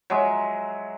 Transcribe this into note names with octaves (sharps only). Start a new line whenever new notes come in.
F#3 G#3 E5